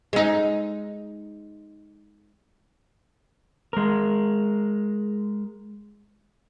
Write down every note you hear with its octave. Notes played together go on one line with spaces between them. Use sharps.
G#3 D#4
G#3 A#4